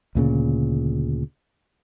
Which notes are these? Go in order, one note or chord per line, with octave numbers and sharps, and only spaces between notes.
D2 A#2 C#3